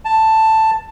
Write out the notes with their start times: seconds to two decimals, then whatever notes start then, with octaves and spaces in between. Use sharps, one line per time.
0.05 A5